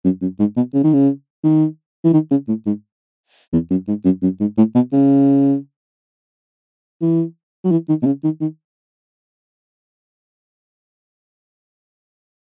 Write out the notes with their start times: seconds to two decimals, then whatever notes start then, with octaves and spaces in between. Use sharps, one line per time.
0.04 F#2
0.22 F#2
0.39 G#2
0.56 B2
0.74 C#3
0.84 D#3
0.93 C#3
1.44 D#3
2.04 E3
2.13 D#3
2.31 C#3
2.48 A2
2.66 G#2
3.53 E2
3.70 F#2
3.88 G#2
4.05 F#2
4.23 F#2
4.40 G#2
4.57 A2
4.75 B2
4.92 C#3
7.02 E3
7.64 F#3
7.71 E3
7.89 D#3
8.02 B2
8.06 C#3
8.24 D#3
8.41 D#3